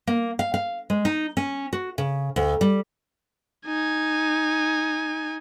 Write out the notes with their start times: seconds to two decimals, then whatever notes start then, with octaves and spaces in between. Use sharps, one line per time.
0.07 A#3
0.39 F5
0.54 F5
0.90 G#3
1.05 D#4
1.37 C#4
1.73 F#4
1.98 C#3
2.36 D2
2.61 G3
3.67 D#4 G#5